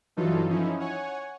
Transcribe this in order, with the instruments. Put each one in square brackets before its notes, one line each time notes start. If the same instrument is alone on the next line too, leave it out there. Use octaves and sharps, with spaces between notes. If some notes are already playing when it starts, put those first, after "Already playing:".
[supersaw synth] G2 E3 F#3 D#4 F4 A4
F3 C#4 D#4 E4
C#5 F#5 G#5